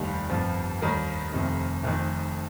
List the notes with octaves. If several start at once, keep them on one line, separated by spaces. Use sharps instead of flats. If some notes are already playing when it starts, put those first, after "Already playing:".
Already playing: F1 D#2 D#3 G3 G4
G1 F2 F3
D#2 D#3 G3 A#4
F1 F2 C3 D#3
F1 F2 D#3